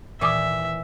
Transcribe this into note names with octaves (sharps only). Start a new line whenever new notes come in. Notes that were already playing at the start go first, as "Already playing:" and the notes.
D#2 A#2 E3 D5 E5 D6 D#6